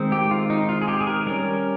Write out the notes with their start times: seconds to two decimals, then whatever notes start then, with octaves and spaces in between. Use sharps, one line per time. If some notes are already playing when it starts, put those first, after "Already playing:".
Already playing: D#3 G#3 C4 D#4
0.12 G4
0.31 F4
0.50 D#4
0.69 F4
0.82 G#4
0.88 G4
1.01 G#4
1.07 A#4
1.26 G3 C#4 A#4